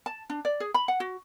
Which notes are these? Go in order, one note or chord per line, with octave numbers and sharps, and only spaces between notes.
A5
D4
D5
G#4
B5
F#5
F#4